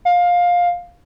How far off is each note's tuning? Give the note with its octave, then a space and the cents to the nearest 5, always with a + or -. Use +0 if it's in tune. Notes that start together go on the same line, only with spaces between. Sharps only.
F5 +15